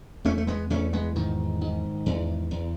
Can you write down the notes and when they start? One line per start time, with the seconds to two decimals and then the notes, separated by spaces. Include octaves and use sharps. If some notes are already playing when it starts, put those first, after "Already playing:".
0.25 E2 A3 C#4
0.38 A3
0.47 G#3 B3
0.70 E2 A3 C#4
0.93 G#3 B3
1.16 G#2 D#3
1.61 G#2
2.06 E2
2.51 E2